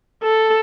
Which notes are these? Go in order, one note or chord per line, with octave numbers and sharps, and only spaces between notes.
A4